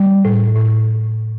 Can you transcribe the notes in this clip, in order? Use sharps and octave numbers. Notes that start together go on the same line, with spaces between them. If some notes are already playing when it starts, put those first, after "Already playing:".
Already playing: G3
A2
A2